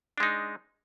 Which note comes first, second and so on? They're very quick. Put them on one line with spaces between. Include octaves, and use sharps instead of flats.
D4 G#3 D#4